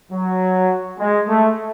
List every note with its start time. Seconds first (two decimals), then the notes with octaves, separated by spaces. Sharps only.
0.12 F#3
0.99 G#3
1.28 A3